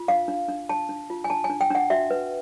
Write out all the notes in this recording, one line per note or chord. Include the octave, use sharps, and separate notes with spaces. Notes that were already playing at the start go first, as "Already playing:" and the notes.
Already playing: F4
D4 F5
D4
D4
D4 A5
D4
F4
G#5
D4 A5
G#5
D4
G5
D4 F#5
F#4 E5
B4